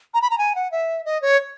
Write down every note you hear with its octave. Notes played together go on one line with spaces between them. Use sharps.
A#5
B5
A#5
G#5
F#5
E5
D#5
C#5